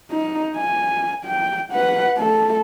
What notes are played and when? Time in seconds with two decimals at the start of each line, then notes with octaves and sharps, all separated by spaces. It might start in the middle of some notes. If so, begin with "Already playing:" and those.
0.11 D#4
0.57 G#5
1.25 G5
1.72 B4 F#5
2.17 A3 A4